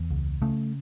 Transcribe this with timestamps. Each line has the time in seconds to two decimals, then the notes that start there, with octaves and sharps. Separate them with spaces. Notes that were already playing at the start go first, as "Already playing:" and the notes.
Already playing: E2
0.11 C#2
0.42 C#3 A3